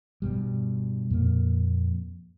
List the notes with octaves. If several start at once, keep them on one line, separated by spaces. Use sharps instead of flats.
G2 B2 G3
F2 A#2 A#3